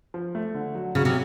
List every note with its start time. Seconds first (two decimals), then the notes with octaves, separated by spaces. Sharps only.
0.14 F3
0.35 A3
0.54 D3
0.75 F#3
0.95 C#3 F#3
1.05 C3